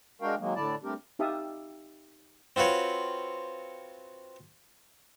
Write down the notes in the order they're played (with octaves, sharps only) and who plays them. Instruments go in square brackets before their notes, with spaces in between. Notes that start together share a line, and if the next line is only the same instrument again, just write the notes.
[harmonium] G#3 D4 F#4 A#4 F5 G5
D#3 F#3 G#3 A#3
A2 D3 E4 D5 A5
G3 A3 C4 D4 G4 A#4
[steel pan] D#4 G4 E5 F5 A5 D#6
[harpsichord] C4 F4 F#4 B4 C#5